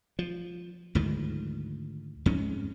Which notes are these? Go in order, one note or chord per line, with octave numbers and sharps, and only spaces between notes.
F3
D2 G#2 D#3 F3
F2 G#2 C#4